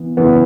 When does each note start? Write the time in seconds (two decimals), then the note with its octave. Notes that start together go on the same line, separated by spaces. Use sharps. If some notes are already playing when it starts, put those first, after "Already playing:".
Already playing: E3 B3
0.17 F#2 C#3 E3 B3